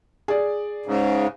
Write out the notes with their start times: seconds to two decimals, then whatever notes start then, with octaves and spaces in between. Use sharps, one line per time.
0.28 G#4 D5
0.86 G#2 C#3